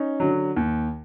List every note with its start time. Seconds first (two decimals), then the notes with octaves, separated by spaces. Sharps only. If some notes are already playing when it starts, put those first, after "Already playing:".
Already playing: C#4 D#4
0.20 D3 F#3
0.56 D#2